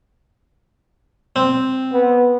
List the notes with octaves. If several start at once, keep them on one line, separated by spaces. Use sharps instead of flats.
C4
B3